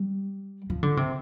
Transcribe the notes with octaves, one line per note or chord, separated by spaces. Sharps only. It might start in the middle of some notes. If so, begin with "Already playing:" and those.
Already playing: G3
F3
D3
C3